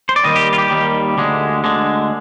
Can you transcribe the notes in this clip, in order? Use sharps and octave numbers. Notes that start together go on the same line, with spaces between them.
C5
D5
D#2 D#3 G3 D#5
G4
F4
G4
D#2 D#3 G3
D2 D3 G#3
D2 D3 G#3